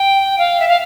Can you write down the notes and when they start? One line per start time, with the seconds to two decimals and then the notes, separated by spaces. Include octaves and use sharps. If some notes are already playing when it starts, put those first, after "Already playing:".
Already playing: G5
0.38 F5
0.60 E5
0.68 F5